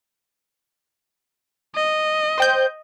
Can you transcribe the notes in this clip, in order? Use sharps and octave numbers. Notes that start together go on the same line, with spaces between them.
D#5
C5 G5 G6